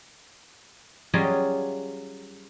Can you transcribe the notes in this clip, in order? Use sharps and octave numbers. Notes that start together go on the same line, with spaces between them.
F#3 G3 C#4 F4 G#4 D#5